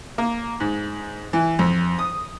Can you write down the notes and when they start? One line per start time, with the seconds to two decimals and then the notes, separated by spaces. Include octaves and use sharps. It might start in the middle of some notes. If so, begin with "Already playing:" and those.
0.18 A#3
0.60 G#2
1.33 E3
1.59 F2
1.99 D#6